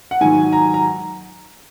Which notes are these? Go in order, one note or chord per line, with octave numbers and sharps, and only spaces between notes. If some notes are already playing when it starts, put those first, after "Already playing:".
F#5
G#2 D#3 F#3 G#5
A#5
A#5